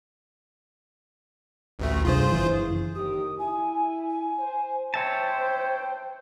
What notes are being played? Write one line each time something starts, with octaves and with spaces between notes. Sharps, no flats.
A1 D2 A3
C2 G2 F4 G#4 C5
F#1 B1 E3
D#2 D#3 G4 D#6
E4 G#5
G#5
C5
C5 C#5 E5 G5 A5